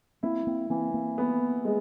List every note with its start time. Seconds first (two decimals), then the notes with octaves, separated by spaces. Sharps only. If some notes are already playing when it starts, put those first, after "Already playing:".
0.23 A#3 C4 E4
0.47 A#3 C4
0.70 E3 A#3 C4
0.94 A#3 C4
1.18 B3
1.65 G#3